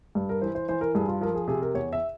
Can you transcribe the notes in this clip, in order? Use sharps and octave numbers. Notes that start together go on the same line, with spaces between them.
G2
A#4
E3 C5
C5
E3 C5
A#4
G2 G#4
F4
F3 A#4
G#4
C3 G#4
A#4
E2 C#5
E5